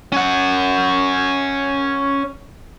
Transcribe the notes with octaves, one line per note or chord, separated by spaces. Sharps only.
C#4 F#5